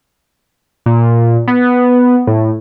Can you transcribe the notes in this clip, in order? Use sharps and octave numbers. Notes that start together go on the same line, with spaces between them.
A#2
B3
A2